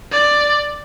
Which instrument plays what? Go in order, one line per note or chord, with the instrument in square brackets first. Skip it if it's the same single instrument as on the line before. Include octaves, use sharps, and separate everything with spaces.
[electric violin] D5